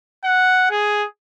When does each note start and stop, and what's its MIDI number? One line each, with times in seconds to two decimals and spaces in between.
0.24 0.70 78
0.71 1.05 68